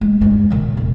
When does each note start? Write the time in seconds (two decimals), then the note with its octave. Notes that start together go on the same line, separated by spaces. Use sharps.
0.01 G#3
0.21 G2 G#3
0.50 A#2 D#3
0.77 E1